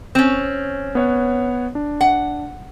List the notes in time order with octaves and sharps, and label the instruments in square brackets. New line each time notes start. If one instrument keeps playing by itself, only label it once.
[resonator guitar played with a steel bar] C4 C#4
[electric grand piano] B3 C#5 F#5
D4
[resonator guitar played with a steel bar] F#5